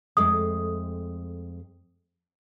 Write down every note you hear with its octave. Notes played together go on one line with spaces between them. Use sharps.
F2 G#3 A3 D#6